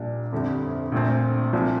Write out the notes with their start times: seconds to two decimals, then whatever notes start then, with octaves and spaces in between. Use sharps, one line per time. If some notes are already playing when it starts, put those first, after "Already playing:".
Already playing: A#1 A#2 G3 D4
0.32 G1 F2 D3 G3 C4
0.92 A#1 A#2 A3 C4
1.53 C2 A#2 F3